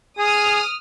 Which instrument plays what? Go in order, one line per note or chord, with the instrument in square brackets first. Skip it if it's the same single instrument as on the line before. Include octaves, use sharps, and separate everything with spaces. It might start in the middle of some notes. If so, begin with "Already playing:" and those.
[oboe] G#4 [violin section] D#6 F6